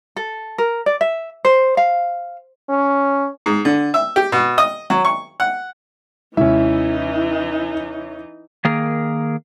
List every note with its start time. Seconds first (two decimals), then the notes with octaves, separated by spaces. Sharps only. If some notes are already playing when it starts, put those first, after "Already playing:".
0.16 A4
0.58 A#4
0.86 D5
1.01 E5
1.45 C5
1.77 F5
2.70 C#4
3.46 G#2
3.65 D3
3.94 E5
4.16 G4
4.32 B2
4.58 D#5
4.90 F#3
5.05 C#6
5.40 F#5
6.37 D#2 C3 E3 G#3 C#4 D#4 E4 E5
8.65 D#3 A#3 G#4 A#4